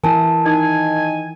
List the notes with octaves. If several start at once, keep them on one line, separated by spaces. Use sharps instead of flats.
E3 E4 A#4 G#5 A5
D#3 D#4 G#5